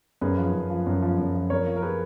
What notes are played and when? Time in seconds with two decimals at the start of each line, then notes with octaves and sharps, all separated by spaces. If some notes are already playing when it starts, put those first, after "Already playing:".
0.21 F#2 G#4 B4
0.38 F3
0.53 F#2
0.70 F3
0.86 F#2
1.02 F3
1.18 F#2
1.34 F3
1.50 F2 A#4 C#5
1.67 F3
1.76 A#4
1.82 G#4 B4